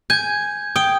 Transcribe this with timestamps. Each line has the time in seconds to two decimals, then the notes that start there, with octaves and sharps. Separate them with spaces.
0.10 G#5 G6 G#6
0.76 G5 D#6